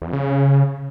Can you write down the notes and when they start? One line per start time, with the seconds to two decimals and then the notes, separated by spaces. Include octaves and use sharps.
0.02 E2
0.07 F2
0.13 C#3